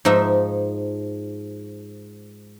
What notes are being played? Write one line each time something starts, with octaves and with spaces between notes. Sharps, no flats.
G#2 F3 D#4 E5